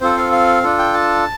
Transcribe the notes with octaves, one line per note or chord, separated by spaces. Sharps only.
C4 F4 A4 C5
F5
F5
D4 F4 A4
G5
A5